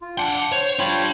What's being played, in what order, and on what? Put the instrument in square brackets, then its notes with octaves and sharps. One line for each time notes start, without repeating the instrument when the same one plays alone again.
[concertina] F4
[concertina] D4 [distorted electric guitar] F#5 G5
[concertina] C5 C6 [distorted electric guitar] C#5
[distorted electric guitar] D4 B5 [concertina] F4 C#5 G5